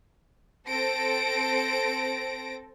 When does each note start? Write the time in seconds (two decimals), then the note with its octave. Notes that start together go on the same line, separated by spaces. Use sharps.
0.68 C4 A4 A#6 D7